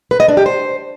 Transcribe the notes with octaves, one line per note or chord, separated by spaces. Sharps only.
B4
D#5
D4
G4
C5